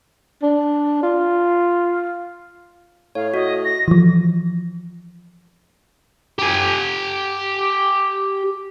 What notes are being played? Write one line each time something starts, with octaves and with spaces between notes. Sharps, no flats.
D4
F4
A2 C#5 F5
F#4 D#5
A#6
E3 F3
G4 G#5